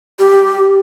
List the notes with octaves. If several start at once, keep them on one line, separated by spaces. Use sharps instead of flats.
G4